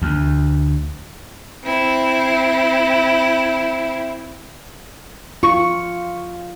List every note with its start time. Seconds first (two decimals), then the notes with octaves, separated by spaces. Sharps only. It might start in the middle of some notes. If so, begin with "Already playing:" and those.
0.02 D2
1.64 C4 E4
5.43 F4 C#6